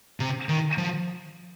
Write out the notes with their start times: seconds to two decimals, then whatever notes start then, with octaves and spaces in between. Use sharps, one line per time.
0.20 C3
0.49 D#3
0.78 F3